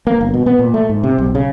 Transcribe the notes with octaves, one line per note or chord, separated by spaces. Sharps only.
A#3
G1
B2
B3
A#2
A3
G#2
C3
B1
C#3